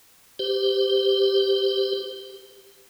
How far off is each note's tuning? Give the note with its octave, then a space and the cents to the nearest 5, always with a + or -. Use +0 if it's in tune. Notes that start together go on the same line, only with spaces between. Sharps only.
G4 +0 C5 -30